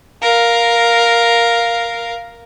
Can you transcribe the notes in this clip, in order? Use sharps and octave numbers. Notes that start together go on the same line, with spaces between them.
A#4 F5